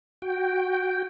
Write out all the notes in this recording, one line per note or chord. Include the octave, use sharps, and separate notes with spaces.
F#4 G5